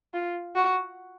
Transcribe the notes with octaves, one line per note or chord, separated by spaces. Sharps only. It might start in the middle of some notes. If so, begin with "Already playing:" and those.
F4
F#4